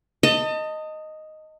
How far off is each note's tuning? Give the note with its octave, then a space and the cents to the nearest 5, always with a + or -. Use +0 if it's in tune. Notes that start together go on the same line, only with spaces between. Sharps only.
D#5 +0 A5 +35